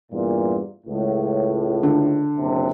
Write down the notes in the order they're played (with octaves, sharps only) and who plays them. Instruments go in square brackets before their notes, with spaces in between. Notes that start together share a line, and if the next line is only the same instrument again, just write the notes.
[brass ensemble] E2 G2 A#2
C#2 A2
[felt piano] D3
[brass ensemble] F#1 C3